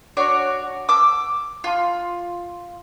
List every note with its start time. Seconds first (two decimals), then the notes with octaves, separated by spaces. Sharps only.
0.17 D4 F#4 C#5 D5
0.89 D6 E6
1.64 F4